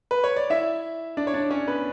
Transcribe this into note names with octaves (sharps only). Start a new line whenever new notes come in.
B4
C#5
D5
E4 E5
D4 D5
C#5
D4 D5
C#4 C#5
B3 B4